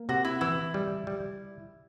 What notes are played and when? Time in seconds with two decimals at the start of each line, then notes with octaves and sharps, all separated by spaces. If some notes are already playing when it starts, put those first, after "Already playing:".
Already playing: A#3
0.09 C3 F#4
0.25 E4
0.41 E3 E4
0.74 G3
1.07 G3